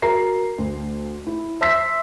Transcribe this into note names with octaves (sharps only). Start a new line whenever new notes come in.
F#4 A#4 A#5 C7
D2
E4
E5 C6 E6 B6 C7